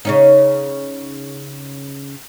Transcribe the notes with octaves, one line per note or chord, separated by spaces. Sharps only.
C#3 C#4 D#4